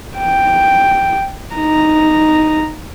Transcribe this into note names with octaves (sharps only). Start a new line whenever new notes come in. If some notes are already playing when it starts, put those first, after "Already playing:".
G5
D#4 A#5